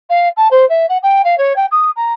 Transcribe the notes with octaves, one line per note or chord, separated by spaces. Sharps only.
F5
A5
C5
E5
F#5
G5
F5
C#5
G5
D#6
A#5